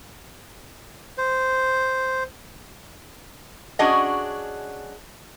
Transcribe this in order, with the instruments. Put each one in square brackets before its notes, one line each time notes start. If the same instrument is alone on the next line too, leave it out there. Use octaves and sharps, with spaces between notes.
[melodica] C5
[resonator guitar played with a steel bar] C#4 D4 F#4 G#4 D#5